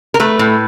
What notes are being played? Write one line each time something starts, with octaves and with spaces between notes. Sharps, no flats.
A#4
A3 B4
A2